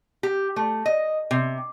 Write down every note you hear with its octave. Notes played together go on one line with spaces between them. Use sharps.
G4
A3
D#5
C3